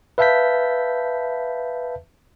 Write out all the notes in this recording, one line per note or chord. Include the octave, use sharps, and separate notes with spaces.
B4 E5 F5 A5 G6 B6